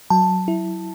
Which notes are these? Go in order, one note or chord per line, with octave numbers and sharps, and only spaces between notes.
F#3 A5
E4